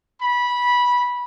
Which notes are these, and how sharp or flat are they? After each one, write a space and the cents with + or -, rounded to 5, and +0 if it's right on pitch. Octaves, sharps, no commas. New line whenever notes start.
B5 -15